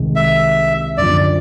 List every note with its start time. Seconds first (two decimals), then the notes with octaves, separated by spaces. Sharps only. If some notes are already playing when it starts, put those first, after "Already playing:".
Already playing: C2 C3 D#3 G#3
0.16 E5
0.98 F#2 D3 F3 D5